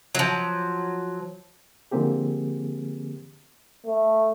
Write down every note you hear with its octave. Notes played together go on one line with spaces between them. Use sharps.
F3 F#3
D3 F3 A#3 C4 G4 G#4
A3